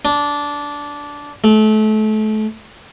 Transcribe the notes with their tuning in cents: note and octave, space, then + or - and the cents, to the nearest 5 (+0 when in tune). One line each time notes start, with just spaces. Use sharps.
D4 -15
A3 -30